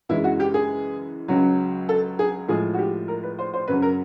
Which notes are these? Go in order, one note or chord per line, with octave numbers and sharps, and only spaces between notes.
F#2 C#3 E3 G#3 E4
F#4
G4
G#4
C#2 C#3 F#3
A4
G#4
A2 F3 G#3 G#4
F#4
G4
A#4
B4
C5
C5
F#2 C#3 F#3 B4
A#4